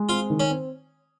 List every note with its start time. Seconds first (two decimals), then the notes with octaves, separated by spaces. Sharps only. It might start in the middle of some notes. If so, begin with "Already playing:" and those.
Already playing: G#3
0.09 C4 F4
0.30 D#3
0.40 C#4
0.50 C4